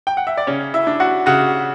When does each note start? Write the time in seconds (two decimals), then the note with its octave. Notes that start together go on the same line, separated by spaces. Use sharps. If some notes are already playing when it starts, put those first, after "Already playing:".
0.07 G5
0.17 F#5
0.27 E5
0.37 D5
0.47 C#3 C#4 C#5
0.74 E4 E5
0.87 D4
1.00 F#4 F#5
1.26 C#3 F#4 F#5